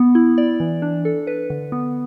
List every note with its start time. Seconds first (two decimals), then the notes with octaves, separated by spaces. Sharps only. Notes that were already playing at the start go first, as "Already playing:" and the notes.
Already playing: B3
0.15 E4
0.38 D5
0.60 E3
0.82 D4
1.05 A4
1.27 B4
1.50 D3
1.72 B3